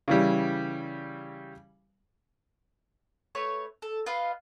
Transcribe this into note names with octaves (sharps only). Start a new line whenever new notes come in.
C#3 E3 G3
A3 B4 C#5 C#6
A4
F4 B4 D#5 F5